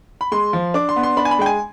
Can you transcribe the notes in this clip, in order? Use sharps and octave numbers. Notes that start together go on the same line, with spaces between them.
B5
G#3 C6
F3
D4 D6
C6
B3
C6
D4 B5
G#5
B5
G#3 G5
G#5